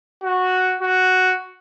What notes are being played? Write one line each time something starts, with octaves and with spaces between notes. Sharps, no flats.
F#4
F#4